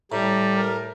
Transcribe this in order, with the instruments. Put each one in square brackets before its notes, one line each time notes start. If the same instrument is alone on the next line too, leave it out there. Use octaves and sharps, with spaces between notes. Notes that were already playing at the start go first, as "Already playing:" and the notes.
[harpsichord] A2 [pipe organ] G3 [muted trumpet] A#5
[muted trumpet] A#4